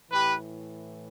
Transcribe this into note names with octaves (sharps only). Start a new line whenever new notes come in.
A2 E3 G4 B4